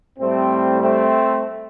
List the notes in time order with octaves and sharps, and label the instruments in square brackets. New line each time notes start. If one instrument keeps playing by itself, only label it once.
[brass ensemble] A2 G3 A3 C4
A3 C4